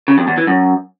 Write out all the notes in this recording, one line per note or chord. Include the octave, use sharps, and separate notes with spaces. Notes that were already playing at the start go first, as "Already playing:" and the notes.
C#3
F2
E2
E3
F#2